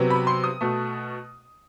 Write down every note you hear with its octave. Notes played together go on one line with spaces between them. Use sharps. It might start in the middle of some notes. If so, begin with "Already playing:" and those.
Already playing: C3 F#3 B3
B5
C6
D#6
B2 A3